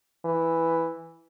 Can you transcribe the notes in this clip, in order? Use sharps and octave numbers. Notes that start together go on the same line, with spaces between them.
E3